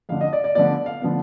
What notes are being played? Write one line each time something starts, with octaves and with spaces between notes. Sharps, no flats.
F2 D3 F3 F5
D#5
D5
D5
D3 F3 B3 D5
F5
D3 F3 B3